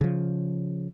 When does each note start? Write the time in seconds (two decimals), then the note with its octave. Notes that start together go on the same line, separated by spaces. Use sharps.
0.01 C#3 F3